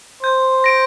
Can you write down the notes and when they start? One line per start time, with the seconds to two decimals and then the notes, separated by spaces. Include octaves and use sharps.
0.23 C5 G6
0.64 A#6 D7